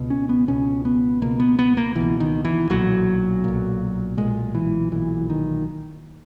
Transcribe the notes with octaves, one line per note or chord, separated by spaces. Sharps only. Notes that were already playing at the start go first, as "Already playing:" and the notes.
Already playing: C#2 B2
C#4
B3
C#2 B2 C#4
B3
C#2 B2 A#3
B3
B3
A#3
C#2 B2 E3
D#3
E3
B1 A#2 F#3
B1 A#2
B1 A#2 G#3
E3
B1 A#2 E3
D#3